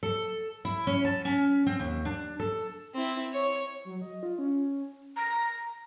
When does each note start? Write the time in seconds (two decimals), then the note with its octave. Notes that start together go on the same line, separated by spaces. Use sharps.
0.03 A4
0.65 E4
0.87 C#4
1.05 A5
1.25 C#4
1.66 C4
1.79 D#2
2.05 D4
2.40 A4
2.94 C4 E4
3.33 C#5
3.85 F#3
4.02 D#5
4.23 F4
4.39 C#4
5.16 A#5